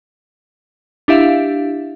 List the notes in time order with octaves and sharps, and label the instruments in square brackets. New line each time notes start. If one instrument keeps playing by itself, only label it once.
[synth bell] D4 E4 G4 E5 F5